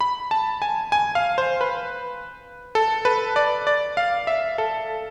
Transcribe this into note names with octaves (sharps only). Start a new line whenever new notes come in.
B5
A5
G#5
G#5
F5
C5
B4
A4
B4
D5
D5
F5
E5
A4